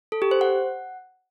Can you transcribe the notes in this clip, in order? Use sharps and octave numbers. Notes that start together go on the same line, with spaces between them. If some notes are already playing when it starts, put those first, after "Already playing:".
A4
G4
C5
F#5